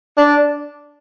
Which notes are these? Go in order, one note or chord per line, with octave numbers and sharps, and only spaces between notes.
D4